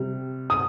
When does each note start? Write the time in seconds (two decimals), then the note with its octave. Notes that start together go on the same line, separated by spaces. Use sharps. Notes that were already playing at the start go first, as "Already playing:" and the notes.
Already playing: C3 G3
0.50 D#6